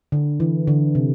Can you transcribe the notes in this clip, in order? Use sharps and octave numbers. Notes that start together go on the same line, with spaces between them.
D3
E3
D3
C3